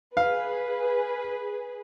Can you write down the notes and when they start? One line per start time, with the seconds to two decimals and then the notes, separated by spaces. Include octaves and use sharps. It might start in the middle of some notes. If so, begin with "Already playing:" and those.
0.17 G#4 B4 F5